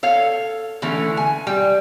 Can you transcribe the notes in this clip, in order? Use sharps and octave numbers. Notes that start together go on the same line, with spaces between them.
A4 C#5 F5
D3 E3 A3 C#4
G#5
G3 G5